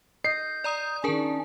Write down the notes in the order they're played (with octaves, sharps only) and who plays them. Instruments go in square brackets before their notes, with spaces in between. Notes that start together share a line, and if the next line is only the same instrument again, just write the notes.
[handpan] D#5 [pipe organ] G6 [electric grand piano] C7
[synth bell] D5 A#5 D#6
[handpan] D#3 D4 [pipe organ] C#4 [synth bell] G#4 A#4 A5